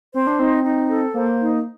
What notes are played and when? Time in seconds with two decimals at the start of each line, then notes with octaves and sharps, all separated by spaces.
0.14 C4 C5
0.27 D4
0.39 C4 D#4
0.64 D#4
0.89 A4
1.14 A#3 C5
1.39 D#4